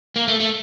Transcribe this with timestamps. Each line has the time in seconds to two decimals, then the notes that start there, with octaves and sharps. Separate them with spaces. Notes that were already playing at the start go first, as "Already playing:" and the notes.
0.16 A#3
0.28 A3
0.40 A3